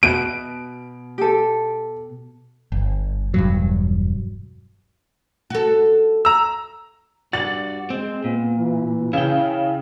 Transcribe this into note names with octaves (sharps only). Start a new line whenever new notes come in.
B2 D7
G4 A4
G1
E1 G2 F#3
F#4 A4
A#5 E6
G2 F#4 D5 A6
G#3 C4
A#2 B3
E3
C#3 E4 G5